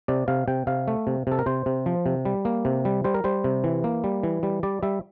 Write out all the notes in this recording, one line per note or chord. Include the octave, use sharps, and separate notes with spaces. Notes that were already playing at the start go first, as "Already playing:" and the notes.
C3 D5
C3 F5
C3 G5
C3 F5
A3
C3
C3 A4
A#4
C3 C5
C3
F3
C3
G3
A#3
C3
G3
G3 C5
A#4
G3 C5
C3
E3
A#3
G3
E3
G3
G3 D5
G3 E5